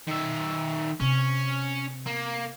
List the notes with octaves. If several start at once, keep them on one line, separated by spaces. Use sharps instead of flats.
D#3 E5
C3 C#4
A#3